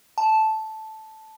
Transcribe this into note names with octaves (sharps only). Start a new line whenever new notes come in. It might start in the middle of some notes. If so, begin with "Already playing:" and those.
A5